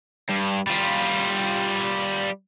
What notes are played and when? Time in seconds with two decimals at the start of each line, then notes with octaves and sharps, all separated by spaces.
0.30 G2
0.67 G3 F4